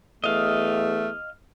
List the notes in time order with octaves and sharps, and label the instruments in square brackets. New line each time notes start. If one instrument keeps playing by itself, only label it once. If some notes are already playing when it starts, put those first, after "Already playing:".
[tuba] E2 [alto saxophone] A3 [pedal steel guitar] D#5 F5